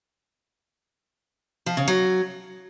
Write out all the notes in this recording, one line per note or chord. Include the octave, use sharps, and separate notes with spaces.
F3
C#3
F#3